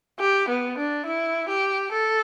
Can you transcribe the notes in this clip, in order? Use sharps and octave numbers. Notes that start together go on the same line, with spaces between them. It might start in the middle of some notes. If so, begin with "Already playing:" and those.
G4
B3
D4
E4
G4
A4